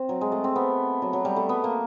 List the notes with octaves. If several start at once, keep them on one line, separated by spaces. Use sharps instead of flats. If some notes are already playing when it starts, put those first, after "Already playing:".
Already playing: C4
F#3
G#3
A3
C4
B3
F#3
F#3
G3
A3
B3
A#3